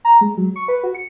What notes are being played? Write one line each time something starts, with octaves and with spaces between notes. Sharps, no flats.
A#5
G#3
F#3
C#6
B4
F#4
C#7